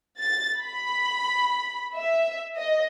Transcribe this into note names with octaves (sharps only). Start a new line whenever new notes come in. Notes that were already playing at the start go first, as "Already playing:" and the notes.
A6
B5
E5
D#5